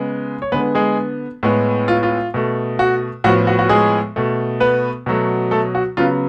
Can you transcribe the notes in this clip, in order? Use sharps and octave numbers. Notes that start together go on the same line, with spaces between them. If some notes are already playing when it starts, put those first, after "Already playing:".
Already playing: C#3 G#3 B3
C#5
D3 G#3 B3 B4
G#3 G#4
A2 G#3 B3
F4
F4
B2 A3
F#4
A2 F3 B3 F#4
F#4
F#4
G#3 G#4
B2 A3
B3 B4
B2 F#3 A3
A3 A4
F#4
C#3 F#3 B3 F4